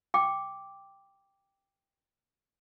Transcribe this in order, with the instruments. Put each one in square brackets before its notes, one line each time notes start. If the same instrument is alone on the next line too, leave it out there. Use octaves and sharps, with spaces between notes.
[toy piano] G5 D6